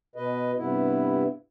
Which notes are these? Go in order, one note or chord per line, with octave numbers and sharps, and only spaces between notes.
B2 B4 D#5
G2 C3 B3 E4